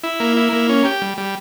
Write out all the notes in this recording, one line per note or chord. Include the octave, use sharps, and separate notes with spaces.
E4
A#3
E4
A#3
C#4
G4
G3
G3